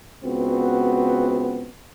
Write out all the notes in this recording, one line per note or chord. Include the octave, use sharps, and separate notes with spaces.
C#2 B3 C4 F#4